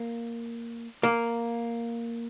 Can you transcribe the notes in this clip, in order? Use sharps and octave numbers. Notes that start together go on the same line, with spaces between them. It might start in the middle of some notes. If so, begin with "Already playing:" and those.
Already playing: A#3
A#3